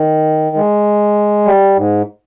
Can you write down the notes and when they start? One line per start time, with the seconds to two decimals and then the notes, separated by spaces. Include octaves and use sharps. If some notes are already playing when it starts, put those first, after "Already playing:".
Already playing: D#3
0.56 G#3
1.46 G3
1.77 G#2